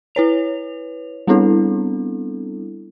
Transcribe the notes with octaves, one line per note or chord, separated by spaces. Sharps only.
E4 B4 C#5 F7
G3 B3 C4 D4 E4 A4